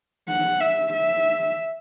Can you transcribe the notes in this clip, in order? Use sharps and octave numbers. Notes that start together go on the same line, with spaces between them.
F#5
E5
E5